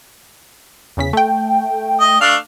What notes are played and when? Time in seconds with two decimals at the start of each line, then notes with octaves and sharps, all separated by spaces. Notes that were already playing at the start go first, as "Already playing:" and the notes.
0.97 E2 C#3 B6
1.13 A3 G5
2.00 D#5
2.21 A3 D4 F5